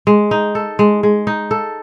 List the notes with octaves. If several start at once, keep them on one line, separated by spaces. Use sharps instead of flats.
G#3
D#4
A4
G#3
G#3
D#4
A4